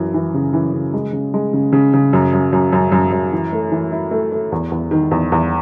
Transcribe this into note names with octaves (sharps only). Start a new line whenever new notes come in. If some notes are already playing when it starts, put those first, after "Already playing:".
Already playing: F#2 E3
E3
C#3
E3
C#3
G#3
C#3
G#3
C#3
C#3
C#3
F#2
F#2
F#2
F#2
F#2
F#2
E3
A3
E3
E4
A3
A3
E2
E2
D#3
E2
E2